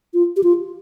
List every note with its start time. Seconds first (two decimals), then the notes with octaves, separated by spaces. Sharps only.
0.14 F4
0.37 G4
0.44 F4